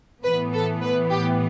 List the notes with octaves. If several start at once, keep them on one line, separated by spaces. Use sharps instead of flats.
A2 E3 B3 B4
A4
B4
G4